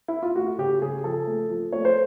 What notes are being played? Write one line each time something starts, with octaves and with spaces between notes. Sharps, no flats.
E4
F4
A3 F#4
C#3 G4
C#3 G#4
F3 A4
A3
F3
A3 C#5
C5